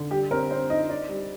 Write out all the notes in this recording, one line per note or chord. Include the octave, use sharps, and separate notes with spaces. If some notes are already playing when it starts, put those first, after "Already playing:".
Already playing: D3
G3 G4
C4 A#4
C4 C5
D#4 D#5
D#4 D5
G3